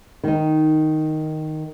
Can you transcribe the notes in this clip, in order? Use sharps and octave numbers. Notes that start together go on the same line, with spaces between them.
D#3 D#4